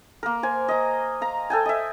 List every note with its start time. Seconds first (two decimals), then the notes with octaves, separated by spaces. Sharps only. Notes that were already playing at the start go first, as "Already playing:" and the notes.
0.23 A#3 A#4
0.43 C5 G#5
0.68 D#5 A#5
1.21 F5 A#5
1.50 A4 G5 G#5
1.65 D#5 E5